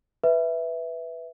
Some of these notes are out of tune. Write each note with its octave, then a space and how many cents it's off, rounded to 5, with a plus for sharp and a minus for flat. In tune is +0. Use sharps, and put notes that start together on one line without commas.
B4 +0 E5 +0